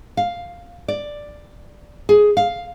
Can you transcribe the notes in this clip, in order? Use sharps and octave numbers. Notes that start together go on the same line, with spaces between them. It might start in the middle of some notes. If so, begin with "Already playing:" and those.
F5
D5
G#4
F5